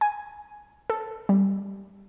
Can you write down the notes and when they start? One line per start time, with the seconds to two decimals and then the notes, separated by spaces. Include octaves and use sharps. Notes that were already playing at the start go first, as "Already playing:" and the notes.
0.01 G#5
0.90 A4
1.29 G3